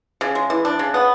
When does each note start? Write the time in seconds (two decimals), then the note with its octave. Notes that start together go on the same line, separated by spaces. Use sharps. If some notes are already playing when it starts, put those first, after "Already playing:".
0.21 C#3
0.35 G#3
0.50 E3
0.65 D4
0.79 C#3
0.94 B3